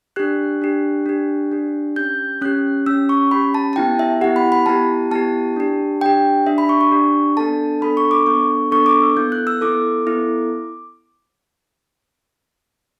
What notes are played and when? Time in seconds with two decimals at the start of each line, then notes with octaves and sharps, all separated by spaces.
0.16 D4 G4 F#6
0.62 D4 G4
1.06 D4 G4
1.51 D4 G4
1.96 C#4 G4 G6
2.41 C#4 G4 F#6
2.86 C#4 G4 E6
3.09 C#6
3.31 C#4 G4 B5
3.54 A5
3.73 A5
3.76 B3 E4 G4 G5
3.99 E5
4.21 B3 E4 G4 F#5
4.36 B5
4.52 B5
4.66 B3 E4 G4 A5
5.11 B3 E4 G4 A5
5.56 D4 G4
6.01 D4 G4 G5
6.46 D4 G4 E5
6.58 B5
6.69 C#6
6.81 C#6
6.91 D4 G4
7.37 B3 D4 A4 A5
7.81 B3 D4 A4 B5
7.97 C#6
8.11 D6
8.26 B3 D4 A4 C#6
8.71 B3 D4 A4 C#6
8.86 D6
9.02 E6
9.17 B3 E4 A4 G6
9.32 F#6
9.47 E6
9.61 B3 E4 A4 D6
10.07 B3 E4 A4